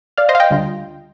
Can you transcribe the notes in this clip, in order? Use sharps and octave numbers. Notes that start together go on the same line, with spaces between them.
D5 F5
C5 D#5
F5
D#5 G5
D2 D3 G3 D4 F4